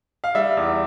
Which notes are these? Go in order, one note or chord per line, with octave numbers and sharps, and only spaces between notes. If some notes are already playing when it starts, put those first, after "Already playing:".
F5
G3 E5
E2